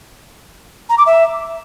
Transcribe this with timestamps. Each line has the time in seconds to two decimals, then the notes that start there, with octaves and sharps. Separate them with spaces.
0.89 A#5
0.98 D6
1.06 E5